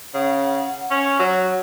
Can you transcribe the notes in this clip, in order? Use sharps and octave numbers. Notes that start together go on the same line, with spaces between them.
C#3 F#5
C#4
F#3 F#5